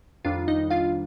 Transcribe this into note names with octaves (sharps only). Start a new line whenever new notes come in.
F2 D#3 G3 D4 F4 F5
D#4 D#5
F4 F5